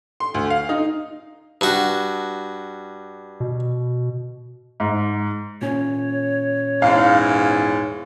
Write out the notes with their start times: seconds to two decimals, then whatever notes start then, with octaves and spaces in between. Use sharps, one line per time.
0.20 C6
0.34 D2
0.50 F5
0.69 D#4
1.61 G2 F#4
3.40 B2
4.80 G#2
5.62 A#2 C#4 C#5
6.82 E2 G#2 F5